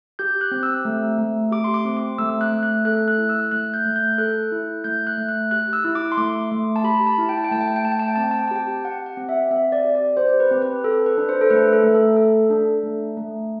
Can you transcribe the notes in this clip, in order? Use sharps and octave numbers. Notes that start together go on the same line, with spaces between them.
G4 G6
F#6
C4
E6
A3
A3
G4 D6
C6
D6
C4
D6
A3 E6
F#6
A3
F#6
A4 F#6
F#6
E4
E6
A3 F#6
G6
A3
G6
A4 F#6
E4
A3 G6
F#6
A3
F#6
G4 F#6
E6
E4
D6
C6
A3 D6
A3
A5
G4 B5
A5
E4
G5
A5
G5
A3 A5
G5
A5
G5
A3 A5
G5
A5
G5
C4 A5
G5
A5
G5
A5
G4 G5
G4 F#5
F#5
C4
E5
C4 E5
D5
G4
D5
G4 C5
B4
C4
B4
A4
B4
D4
C5
A4
A3 B4
A4
A3
A4
A4
D4
A3
A3